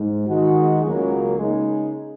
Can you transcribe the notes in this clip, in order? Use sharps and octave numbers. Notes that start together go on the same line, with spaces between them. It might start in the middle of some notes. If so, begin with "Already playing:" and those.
Already playing: G#2
D#3 G#3 D#4 F#4
C#2 C#3 F#3 A#3
C#3 G#3 D#4 G#4